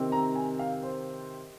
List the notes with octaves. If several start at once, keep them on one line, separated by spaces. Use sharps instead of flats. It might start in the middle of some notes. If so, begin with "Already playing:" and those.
Already playing: C3 D#3 C4
A#5
G#5
F5
C5